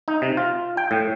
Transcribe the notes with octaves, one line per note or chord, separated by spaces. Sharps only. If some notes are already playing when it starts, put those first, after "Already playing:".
D#4
C3
F4
G5
A2